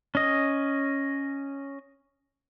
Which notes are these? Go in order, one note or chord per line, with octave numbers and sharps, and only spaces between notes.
C#4 D#5